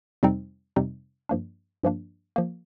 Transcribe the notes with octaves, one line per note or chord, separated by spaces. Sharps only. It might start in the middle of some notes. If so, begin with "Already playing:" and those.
F2 C3 G3 C4 D#4
F2 C3 G3 C4 D#4
G2 F3 A#3 D4
G2 F3 A#3 D4
F3 A#3